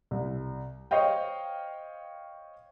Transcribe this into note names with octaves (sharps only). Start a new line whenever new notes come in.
C2
C5 C#5 D#5 F5 G5